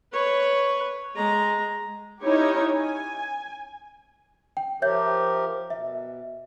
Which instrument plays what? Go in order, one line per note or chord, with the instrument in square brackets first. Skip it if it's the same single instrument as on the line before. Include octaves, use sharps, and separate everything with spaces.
[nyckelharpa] B4 C#5
G#3 A#5
[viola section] C#4 D#4 E4 G4 C#5
G#5
[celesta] G5
[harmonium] F3 G4 A#4 [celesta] C#5 E5 G6
[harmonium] B2 [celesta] E5